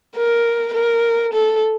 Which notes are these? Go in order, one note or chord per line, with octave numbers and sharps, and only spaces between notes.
A#4
A#4
A4